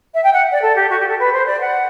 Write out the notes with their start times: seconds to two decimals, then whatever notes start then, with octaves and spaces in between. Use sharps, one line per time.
0.14 E5
0.23 G5
0.33 F#5
0.52 D5
0.62 A4
0.75 G4
0.90 F#4
1.00 G4
1.09 A4
1.19 B4
1.33 C5
1.46 D5
1.60 F#5